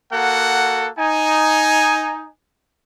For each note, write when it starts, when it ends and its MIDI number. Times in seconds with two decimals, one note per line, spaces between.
0.12 0.90 58
0.12 0.90 66
0.12 0.90 69
0.12 0.90 78
0.98 2.29 63
0.98 2.29 80